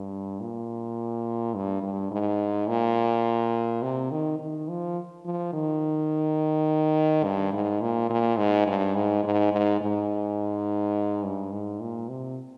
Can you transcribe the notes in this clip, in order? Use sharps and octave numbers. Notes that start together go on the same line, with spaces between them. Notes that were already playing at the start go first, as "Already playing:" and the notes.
Already playing: G2
A#2
G2
G2
G#2
A#2
C3
D#3
D#3
F3
F3
D#3
G2
G#2
A#2
A#2
G#2
G2
G#2
G#2
G#2
G#2
G2
G#2
A#2
C3